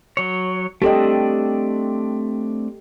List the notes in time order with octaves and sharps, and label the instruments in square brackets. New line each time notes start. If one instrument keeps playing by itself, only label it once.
[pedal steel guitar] F#3 C#5
[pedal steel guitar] A3 C4 D4 [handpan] G4 A4 D#5